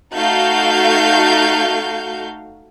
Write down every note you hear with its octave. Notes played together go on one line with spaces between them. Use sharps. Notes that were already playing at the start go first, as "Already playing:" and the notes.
A3 D#4 F#4 F5 G6